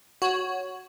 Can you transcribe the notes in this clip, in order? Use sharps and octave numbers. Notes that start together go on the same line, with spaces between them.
F#4 C#5